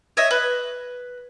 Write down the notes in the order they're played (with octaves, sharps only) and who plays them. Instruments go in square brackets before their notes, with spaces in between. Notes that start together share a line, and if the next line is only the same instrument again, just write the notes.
[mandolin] C#5 D#5 E5
B4